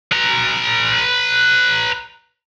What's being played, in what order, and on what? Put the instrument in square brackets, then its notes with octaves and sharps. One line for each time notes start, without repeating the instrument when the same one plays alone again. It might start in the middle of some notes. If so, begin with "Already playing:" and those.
[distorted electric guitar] B4 A#5